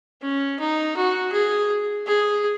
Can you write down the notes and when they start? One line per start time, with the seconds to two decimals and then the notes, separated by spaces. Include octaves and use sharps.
0.22 C#4
0.60 D#4
0.97 F#4
1.32 G#4
2.07 G#4